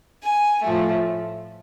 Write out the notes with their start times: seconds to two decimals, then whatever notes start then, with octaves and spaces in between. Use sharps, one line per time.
0.23 G#5
0.63 A2 F3 A3